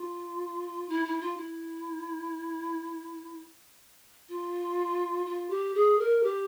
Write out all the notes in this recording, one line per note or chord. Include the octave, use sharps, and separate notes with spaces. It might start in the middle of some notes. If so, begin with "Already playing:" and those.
Already playing: F4
E4
E4
F4
E4
F4
F4
G4
G#4
A#4
G4